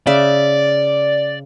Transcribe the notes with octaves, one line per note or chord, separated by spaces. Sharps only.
C#3 D5 E5